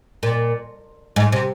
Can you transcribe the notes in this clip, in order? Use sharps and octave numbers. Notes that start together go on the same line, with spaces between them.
A#2
G#2
C3